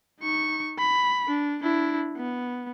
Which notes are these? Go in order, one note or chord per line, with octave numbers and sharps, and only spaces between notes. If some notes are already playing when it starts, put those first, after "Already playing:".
D#4 C#6
B5
D4
D4 E4
B3